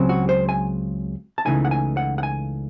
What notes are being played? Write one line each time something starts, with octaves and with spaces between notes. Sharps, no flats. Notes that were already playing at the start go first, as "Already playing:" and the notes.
Already playing: C#2 C#3 F#3 C4
F#4
C5
G#5
A5
C#2 C#3 E3 A3 D#4 G#5
F#5
G#5
F#5
F#5
G#5